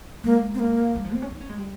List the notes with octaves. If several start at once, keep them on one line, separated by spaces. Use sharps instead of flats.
G#3 A#3
C4
A#3
G3
F3
C4
C#4
D#4
C#4
G#3
G3